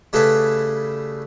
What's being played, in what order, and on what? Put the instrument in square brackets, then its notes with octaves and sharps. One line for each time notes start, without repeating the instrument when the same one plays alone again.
[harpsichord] C#3 G3 A3 E4 G#4 B4